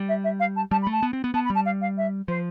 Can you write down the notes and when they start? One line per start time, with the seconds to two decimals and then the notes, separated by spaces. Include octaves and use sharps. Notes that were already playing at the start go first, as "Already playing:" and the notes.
Already playing: G3
0.08 E5
0.24 E5
0.39 F5
0.56 A5
0.71 G3 A5
0.82 B5
0.87 A3
0.92 A5
1.03 B3
1.13 C4
1.24 B3
1.34 B3 A5
1.44 B5
1.50 G3 A5
1.65 F5
1.81 F5
1.97 E5
2.28 F3 C5